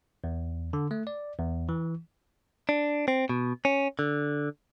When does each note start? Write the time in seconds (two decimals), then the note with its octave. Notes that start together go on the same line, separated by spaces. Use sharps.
0.24 E2
0.73 D3
0.91 A3
1.07 D5
1.39 E2
1.69 E3
2.69 D4
3.08 C4
3.29 B2
3.65 C#4
3.99 D3